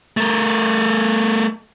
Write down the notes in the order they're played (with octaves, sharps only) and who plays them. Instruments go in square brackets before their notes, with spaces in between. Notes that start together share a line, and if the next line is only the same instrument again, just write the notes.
[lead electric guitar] A3 A#4